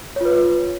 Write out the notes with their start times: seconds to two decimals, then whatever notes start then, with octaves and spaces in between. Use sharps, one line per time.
0.16 C#5
0.21 F4
0.25 B4